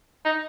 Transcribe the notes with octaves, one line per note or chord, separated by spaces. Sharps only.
D#4